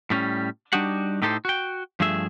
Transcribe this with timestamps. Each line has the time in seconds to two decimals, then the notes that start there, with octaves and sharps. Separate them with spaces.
0.10 A2 G3 C#4
0.73 G3 D4 D#4 F#4 G4 F#5
1.22 A2 D#4 G4 A4 A#4 C5
1.45 F#4 G5
2.00 G2 F3 A3 G#4 E5